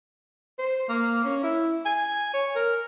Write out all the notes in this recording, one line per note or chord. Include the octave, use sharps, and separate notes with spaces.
C5
A#3
C#4
E4
G#5
C#5
A#4